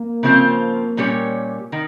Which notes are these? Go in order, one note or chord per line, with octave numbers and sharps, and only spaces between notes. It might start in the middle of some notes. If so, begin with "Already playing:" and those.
Already playing: A#3
C#3 F3 C4 F4 C5
A#2 G3 C#4 G4 C#5
D#3